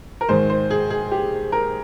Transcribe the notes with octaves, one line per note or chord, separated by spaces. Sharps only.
A#4
G#2 D#3 C5
C5
G#4
G#4
G4
A#4